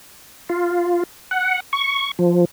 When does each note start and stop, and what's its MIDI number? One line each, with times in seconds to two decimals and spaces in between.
0.49 1.03 65
1.31 1.60 78
1.73 2.11 85
2.19 2.45 53